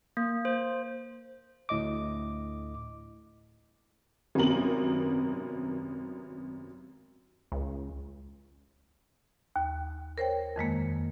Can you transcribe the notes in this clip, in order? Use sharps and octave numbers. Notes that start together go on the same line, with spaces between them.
A#3
C5
D2 A2 D#5 D6
G#1 F#2 C3 B3 A#4 F#7
C#2
D#2
A#4 C5 C#5 G5
F2 D#3 G#3 A#3